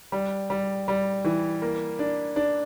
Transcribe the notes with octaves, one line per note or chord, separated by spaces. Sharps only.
G3
G3
G3
E3
A#3
D4
D4